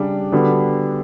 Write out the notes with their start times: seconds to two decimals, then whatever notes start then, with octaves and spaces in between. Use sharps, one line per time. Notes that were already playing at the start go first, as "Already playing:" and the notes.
Already playing: C#3 G3 D4
0.32 D3 G3 B3 D4 F#4